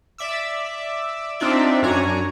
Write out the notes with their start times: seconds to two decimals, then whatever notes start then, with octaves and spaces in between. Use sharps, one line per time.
0.18 D5 E5 D6 E6
1.40 C4 D4 D#4 F4 D5 E5
1.82 F#2 D4 F#4 C#5 G#5 A#5